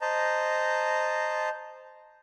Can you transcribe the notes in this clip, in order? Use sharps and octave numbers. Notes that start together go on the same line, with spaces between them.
C5 D#5 A5 A#5